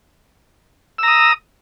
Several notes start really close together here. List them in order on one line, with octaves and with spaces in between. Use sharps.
E6 A#5 D#6